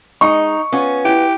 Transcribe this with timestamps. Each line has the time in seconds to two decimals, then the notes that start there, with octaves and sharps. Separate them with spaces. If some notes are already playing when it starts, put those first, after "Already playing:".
0.21 G#3 D#4 C#6
0.72 B3 C#4 F4
1.05 E4 G4